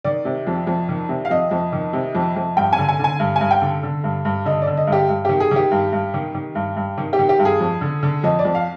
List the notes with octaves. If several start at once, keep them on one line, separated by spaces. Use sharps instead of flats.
D#3 D5
C3
F2
F2
D#3
C3
F5
F2 D#5
F2
D#3
C3
F2
F2
G2 G5
G#5
D3
G#5
D3 G#5
G2
G2 G#5
G5
D3
D3
G2
G2
D3 D#5
D5
D3
D#5
G2
G4
G2
D#3 G4
G#4
D#3 G4
G2
G2
D#3
D#3
G2
G2
D#3
G4
D#3
G4
G2
G#4
F2
D3
D3
F2 D#5
D5
F2
F5